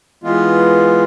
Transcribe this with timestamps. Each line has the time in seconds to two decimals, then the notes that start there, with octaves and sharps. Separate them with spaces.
0.24 E3 G#3 B3 F4